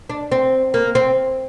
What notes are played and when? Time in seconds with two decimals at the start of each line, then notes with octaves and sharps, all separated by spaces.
0.09 D4
0.32 C4
0.74 A#3
0.95 C4